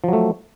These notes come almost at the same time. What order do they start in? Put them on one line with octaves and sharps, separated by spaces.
F3 F#3 A3